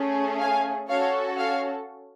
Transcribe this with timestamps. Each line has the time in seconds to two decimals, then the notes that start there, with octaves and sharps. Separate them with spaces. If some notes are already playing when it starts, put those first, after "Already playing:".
Already playing: A3 C#4 G#4
0.40 F5 G#5
0.89 C#4 F#4 A4 C#5 F5
1.39 C#5 F5